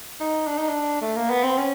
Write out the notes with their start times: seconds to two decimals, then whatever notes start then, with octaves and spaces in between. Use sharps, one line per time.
0.20 D#4
0.47 D4
0.58 D#4
0.69 D4
1.02 A3
1.16 A#3
1.30 B3
1.43 C4
1.58 C#4